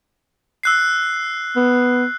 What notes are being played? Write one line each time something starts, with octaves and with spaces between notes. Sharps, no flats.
E6 F#6 C7
B3